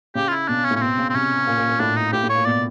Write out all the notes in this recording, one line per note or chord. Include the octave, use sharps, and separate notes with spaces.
C#3 G4
F4
E4
B2 D4
C#4
A2
C#4
B2 C4
C#3
C4
C3 C#4
A#2
A#2
A#2
A2 D4
D#4
A2 G4
A2
C#5
A#2
B2 D5